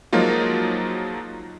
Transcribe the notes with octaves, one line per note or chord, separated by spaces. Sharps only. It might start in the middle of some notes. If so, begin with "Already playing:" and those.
F3 F#3 G#3 A#3 D#4 F4